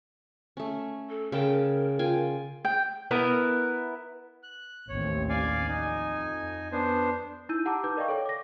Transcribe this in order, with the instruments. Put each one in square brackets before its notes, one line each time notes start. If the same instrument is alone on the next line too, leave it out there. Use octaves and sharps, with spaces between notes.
[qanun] A3 C#4
[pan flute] A4
[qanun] C#3 G5 A5 [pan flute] A#4
[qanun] F4 G5 G#5
[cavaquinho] G5
[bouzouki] B3 E4 A#4
[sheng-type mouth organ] F#6
[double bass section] A1 D#2 C4 [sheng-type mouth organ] C#5
[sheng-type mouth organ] D5 F5 G#5
[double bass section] F2 [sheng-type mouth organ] D#4 G#5
[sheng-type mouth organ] B3 D4 C5
[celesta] D#4 E4 E6 G6 D#7
G4 F#5 A5 A#5 D6 E6
D#4 B4 D6 G6
A#4 D5 D#5 F5 G5 C#6
A4 C#5 G5
D6 A#6